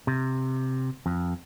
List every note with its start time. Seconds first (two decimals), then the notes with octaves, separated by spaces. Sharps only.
0.07 C3
1.06 F2